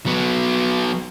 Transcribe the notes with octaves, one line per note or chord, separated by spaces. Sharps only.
F#3 B3